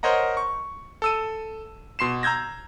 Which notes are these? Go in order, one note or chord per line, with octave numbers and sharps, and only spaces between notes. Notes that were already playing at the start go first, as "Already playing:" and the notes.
A#4 C5 C#5 D#5 F#5 A#5
C#6
A4 E6 D#7
B2 C6 C7 E7
A#5 E6 G6 G#6 A#6